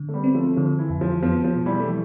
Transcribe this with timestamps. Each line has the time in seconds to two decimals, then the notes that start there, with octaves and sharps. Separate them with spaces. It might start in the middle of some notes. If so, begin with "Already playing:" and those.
Already playing: D3
0.09 A3
0.13 G3 B3
0.24 C4
0.35 F3 A3
0.56 D3 F3
0.79 E3
0.90 F2
1.01 F3
1.22 F3 B3
1.44 F3
1.56 B2
1.66 E3 G3
1.80 A3
1.88 E3 F3 G3